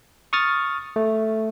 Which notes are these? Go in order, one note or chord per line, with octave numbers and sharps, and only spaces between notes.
C#6 D#6 F6 A6
A3